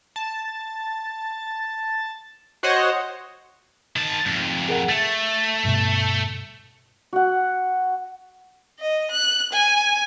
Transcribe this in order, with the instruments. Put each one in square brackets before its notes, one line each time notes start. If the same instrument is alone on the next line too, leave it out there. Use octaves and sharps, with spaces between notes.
[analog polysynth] A5
F#4 C5 C#5 D#5 F#5
[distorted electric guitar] D#3 A5
F2 G#2
[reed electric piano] G#4 A#4 F#5
[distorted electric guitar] A3 [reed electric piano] A6
[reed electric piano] D2 G2 B2
[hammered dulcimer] F#4 F#5
[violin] D#5
F#6
G#5